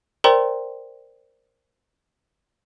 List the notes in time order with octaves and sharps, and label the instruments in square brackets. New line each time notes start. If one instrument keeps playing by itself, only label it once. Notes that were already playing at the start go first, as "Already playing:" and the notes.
[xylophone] A#4 C5 D5 G5 A#5 C6